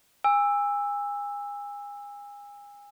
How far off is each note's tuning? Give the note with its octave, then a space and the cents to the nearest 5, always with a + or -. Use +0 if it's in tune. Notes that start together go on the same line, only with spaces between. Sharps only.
G#5 -30 E6 +0